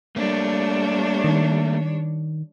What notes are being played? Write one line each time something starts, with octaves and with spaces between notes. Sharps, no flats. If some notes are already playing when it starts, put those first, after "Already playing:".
G3 A3 A#3 D4 C#5
D#3